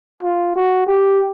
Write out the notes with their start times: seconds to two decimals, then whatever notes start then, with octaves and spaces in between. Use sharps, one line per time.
0.23 F4
0.55 F#4
0.87 G4